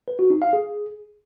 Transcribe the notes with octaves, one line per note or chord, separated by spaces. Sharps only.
B4
F#4
D#4
F5
G#4